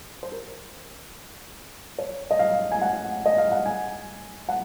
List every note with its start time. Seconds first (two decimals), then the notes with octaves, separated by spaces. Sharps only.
0.23 C5
0.32 A#4
1.99 C#5
2.31 D#5
2.39 F5
2.72 G#5
2.82 F#5
3.26 D#5
3.38 F5
3.52 F#5
3.66 G#5
4.49 F#5